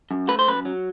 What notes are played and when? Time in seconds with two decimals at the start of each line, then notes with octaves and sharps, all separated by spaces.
0.11 F#2
0.28 A3 B4
0.39 C5
0.48 F#2 B4
0.65 F#3